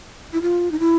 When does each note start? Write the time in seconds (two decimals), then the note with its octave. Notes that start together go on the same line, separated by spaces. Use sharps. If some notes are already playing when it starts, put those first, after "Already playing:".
0.33 E4
0.42 F4
0.72 D#4
0.79 E4